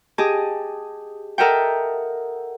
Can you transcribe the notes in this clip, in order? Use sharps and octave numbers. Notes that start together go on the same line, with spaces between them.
G4 G#4 D#5 A5 D#6
A4 A#4 D#5 E5 F#5 G5